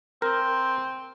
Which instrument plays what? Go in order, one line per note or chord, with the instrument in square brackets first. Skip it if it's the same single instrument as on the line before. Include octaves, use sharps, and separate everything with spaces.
[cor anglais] C4 [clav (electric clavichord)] A#4